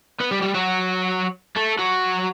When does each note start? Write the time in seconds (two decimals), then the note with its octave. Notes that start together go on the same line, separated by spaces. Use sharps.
0.20 B3 B4
0.31 G3 G4
0.42 G3 G4
0.54 F#3 F#4
1.56 A3 A4
1.79 F#3 F#4